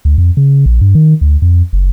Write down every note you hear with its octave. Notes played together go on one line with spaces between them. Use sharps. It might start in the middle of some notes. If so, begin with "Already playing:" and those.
D2
F2
C#3
A#1
G2
D#3
D2
F2
F#1